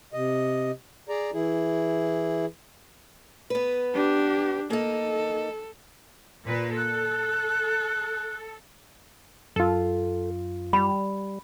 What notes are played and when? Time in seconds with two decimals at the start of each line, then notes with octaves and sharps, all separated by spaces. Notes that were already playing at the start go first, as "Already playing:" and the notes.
0.14 C3 D#5
1.09 G#4 D5 A#5
1.33 E3 E4 G#4
3.50 B3 B4
3.94 D4 G4
4.70 A#3 D#4 A4
6.45 A#2 B4
6.76 A4 F#6
9.56 F#2 F4 A4
10.73 G3 B5